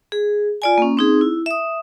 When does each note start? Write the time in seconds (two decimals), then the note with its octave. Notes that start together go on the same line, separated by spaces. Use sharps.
0.12 G#4
0.62 F4 D5 G#5
0.78 A#3 C#4
0.97 C4 D#4 G#4
1.21 E4
1.46 E5 D#6